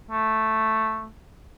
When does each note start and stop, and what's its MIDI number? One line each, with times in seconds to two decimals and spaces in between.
0.11 1.07 57